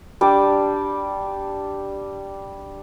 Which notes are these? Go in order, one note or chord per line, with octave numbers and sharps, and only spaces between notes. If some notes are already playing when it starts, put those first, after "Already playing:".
G3 D4 D5 G5